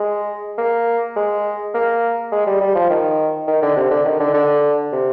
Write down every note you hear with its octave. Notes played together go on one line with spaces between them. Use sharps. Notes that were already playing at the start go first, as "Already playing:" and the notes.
Already playing: G#3
A#3
G#3
A#3
G#3
G3
G3
F3
D#3
D#3
D3
C3
D3
D#3
D3
D3
C3